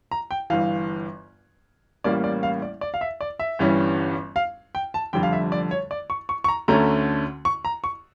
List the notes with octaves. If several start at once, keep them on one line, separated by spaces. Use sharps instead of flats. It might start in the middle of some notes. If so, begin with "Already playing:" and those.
A#5
G5
G1 G2 E3 F5
A1 A2 G3 A#3 C#4 D5
D5
F5
D5
D5
F5
E5
D5
E5
G1 G2 E3 G3 C#4
F5
G5
A5
F1 F2 D3 G3 G5
F5
E5
D5
C#5
D5
C#6
C#6
C#6
A#5
D2 D3 A3 C#4 A#5
C#6
A#5
C#6